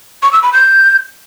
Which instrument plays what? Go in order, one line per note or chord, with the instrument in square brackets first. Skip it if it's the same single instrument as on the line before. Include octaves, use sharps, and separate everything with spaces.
[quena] C#6
E6
B5
G6